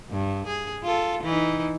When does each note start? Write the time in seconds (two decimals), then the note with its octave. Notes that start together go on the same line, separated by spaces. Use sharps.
0.10 G2
0.47 G#4
0.84 F4 A4
1.23 E3 D#4